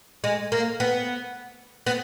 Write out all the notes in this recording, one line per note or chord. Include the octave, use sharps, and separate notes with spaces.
G#3
A#3
B3
B3